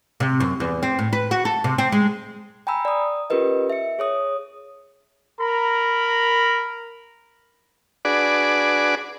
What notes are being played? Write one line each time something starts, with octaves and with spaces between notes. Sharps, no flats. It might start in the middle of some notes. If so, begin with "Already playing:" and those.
C3
F#2
E2
C4
A2
B4
F#4
A4
C3
C4
G#3
G5 G#5 A#5 B5 E6
D5 D#6
C#4 F4 G4 A#4 B4 D#5
E5 C#7
G#4 C#5 D#6
A#4 A#5 B5
D4 F#4 G#4 B4 D5